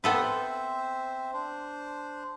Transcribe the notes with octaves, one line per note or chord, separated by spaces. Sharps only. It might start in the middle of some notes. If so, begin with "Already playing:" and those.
B3 C4 A4 B4 C5 E5
D4 C5